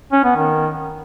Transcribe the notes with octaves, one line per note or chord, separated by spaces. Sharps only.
C#4
B3
D#3